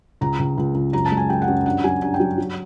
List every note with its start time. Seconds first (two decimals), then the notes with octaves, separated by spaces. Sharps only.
0.21 C#2 A#5
0.39 C#2
0.58 C#2
0.75 C#2
0.93 F#2 A#5
1.05 A5
1.11 G#3
1.17 G#5
1.30 F#2 G5
1.42 F#5
1.48 F#2
1.66 G2 F#5
1.84 F#3 G#5
2.02 G2 G#5
2.14 G5
2.20 F#3
2.38 F#3